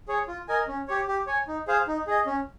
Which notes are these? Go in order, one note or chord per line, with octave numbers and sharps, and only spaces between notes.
G#4 C#5
F4
A#4 D#5 G#5
C#4
G4 C#5
G4
C#5 G#5
D#4
G#4 C5 F5
D#4
G#4 D#5
C#4